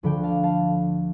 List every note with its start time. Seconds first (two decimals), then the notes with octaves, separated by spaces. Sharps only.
0.03 D2 D3 F3 G5 B5
0.23 F5 A5
0.43 F5 A5